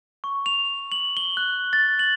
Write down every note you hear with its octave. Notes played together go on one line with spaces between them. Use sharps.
C#6
F7
F#7
G7
F#6
A6
F#7